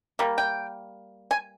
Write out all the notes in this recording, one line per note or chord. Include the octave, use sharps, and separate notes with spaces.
G3 A#3
G5
G#5